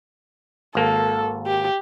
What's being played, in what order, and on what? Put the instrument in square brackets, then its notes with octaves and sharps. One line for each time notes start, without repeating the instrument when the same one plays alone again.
[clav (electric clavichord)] G#1 A#3 [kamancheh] A4
[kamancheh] G4